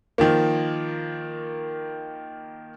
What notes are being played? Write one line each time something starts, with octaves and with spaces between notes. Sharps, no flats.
D#3 F3 A#3